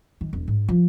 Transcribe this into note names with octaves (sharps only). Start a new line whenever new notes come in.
D#3
E1
G#2
F3